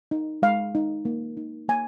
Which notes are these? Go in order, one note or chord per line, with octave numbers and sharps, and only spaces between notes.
D#4
G#3 F5
D#4
A#3
D#4
A#3 G#5